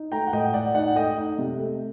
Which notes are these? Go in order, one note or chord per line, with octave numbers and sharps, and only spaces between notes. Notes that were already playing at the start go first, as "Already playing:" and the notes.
Already playing: D#4
A3 G5 A#5
F#5
A2 D#5 G5
A2 D5 F#5
D#4 D5 F#5
A3 D#5 G5
D#4
C3
A3